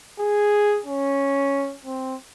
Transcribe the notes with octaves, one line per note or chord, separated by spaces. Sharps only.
G#4
C#4
C4